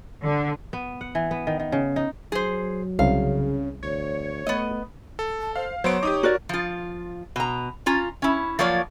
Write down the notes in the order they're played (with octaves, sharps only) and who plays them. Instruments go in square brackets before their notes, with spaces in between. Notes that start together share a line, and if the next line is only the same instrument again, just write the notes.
[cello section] D3
[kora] B3
F#5
E3
B3
D#3
D#3
C#3
D#4
[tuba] F#3 [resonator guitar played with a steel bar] G#4 C5
[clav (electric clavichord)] C2 [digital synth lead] C#3 [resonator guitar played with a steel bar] F5
[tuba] D2 [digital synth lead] C#5
[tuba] A3 [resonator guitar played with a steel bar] B3 D#5
[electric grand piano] A4
[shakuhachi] A5
[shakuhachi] C5 [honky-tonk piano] F5
[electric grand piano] F#3 B3 D7 [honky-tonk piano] C5 [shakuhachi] C#5
[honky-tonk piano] D#4 G4 [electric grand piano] D6 D#6
[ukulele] F#4 D5 [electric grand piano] A#4
[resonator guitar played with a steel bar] F3 F4
B2 A#5
C#4 F4 A#5
C#4 E4
F3 F#3 A#3 F4 C#5 D5